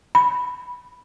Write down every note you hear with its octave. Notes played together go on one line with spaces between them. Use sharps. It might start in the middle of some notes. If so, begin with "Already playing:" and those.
B5